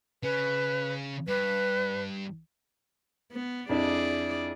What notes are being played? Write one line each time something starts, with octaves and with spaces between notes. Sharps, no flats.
C#3 C#4 B4
G2 B4
B3
F2 D4 E4 G#4 D5